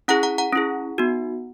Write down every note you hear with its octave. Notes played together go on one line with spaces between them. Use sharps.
C#4 E4 G#4 F#5 A#5
F#5 A#5
F#5 A#5
C#4 E4 G#4
B3 D#4 F#4